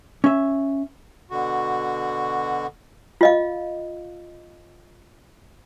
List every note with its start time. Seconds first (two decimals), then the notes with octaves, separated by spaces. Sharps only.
0.24 C#4 E5
1.31 B2 D3 F#4
3.21 F4 D#5 F5